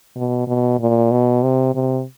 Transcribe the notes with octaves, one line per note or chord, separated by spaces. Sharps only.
B2
B2
A#2
B2
C3
C3